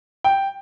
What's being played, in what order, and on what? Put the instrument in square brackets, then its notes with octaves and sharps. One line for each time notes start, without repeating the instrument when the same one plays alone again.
[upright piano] G5